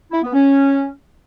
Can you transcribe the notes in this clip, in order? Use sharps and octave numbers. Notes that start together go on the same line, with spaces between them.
E4
B3
C#4